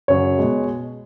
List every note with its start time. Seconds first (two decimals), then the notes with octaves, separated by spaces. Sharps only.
0.08 F#2 C#3 F#3 C#5
0.38 B2 G#3